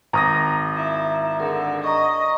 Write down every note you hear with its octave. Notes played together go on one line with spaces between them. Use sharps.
G#1 A#5 D#6 A#6
E4
D3 G#4 A#4
D#5 A#5 C#6